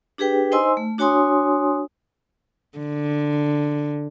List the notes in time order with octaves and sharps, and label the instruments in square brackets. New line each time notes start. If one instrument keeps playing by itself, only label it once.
[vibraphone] D4 G4 G#4 B4 G5
D#4 C5 D#5 G#5 C6 E6
A3
D4 F#4 C#5 G#5 C6 D#6
[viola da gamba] D3